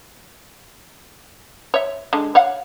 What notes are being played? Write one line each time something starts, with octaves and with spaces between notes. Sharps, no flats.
C#5 E5
D3 G#3
C#5 F5 F#5